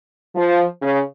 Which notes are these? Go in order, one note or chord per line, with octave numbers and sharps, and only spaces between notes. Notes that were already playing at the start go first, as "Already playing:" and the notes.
F3
C#3